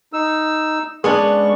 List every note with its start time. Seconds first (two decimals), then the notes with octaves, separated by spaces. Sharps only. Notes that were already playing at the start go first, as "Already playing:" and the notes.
0.13 D#4 E6
1.04 G#3 B3 C#4 D4 C#6